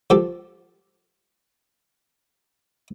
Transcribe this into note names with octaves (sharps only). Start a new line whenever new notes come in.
F3 G4 A4